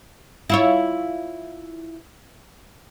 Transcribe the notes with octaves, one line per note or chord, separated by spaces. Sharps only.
E4 F4 C#5